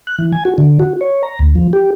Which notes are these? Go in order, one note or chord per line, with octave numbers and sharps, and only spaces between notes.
F#6
E3
G#5
F#4
D3
F#4
C#5
A#5
D2
F3
G4